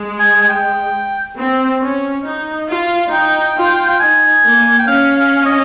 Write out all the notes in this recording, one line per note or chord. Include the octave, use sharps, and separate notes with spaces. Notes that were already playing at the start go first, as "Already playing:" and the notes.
Already playing: G#3
G#5
G#5
G5
C4
C#4
D#4
F4
D#4 G5
F4
G5
D#4 G#5
A#3
G5
C#4 F5
F5
D#5